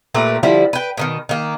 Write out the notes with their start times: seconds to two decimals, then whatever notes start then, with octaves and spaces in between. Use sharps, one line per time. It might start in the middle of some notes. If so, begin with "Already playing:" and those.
0.14 A#2 A3 G4 B4
0.43 D3 F3 G3 E4
0.73 B4 G5
0.97 B2 D3 D#3
1.29 D#3 A#3